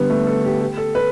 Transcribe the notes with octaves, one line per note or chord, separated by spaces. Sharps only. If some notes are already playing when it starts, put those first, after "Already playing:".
Already playing: D3 G3 B3
A3
A4
G4
G4
A4
B4